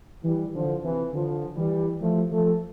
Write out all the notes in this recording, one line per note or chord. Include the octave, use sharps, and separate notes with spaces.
E3 G3
D3 F3
C3 E3
D3 F3
E3 G3
F3 A3
F3 A3